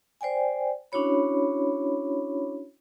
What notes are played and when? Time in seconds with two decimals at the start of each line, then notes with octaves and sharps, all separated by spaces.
0.21 C5 D5 G5 G#5
0.92 C#4 D4 E4 F#4 C#5 B5